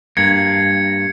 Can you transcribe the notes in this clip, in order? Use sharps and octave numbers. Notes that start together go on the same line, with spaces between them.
G2 A#3 G#6 C#7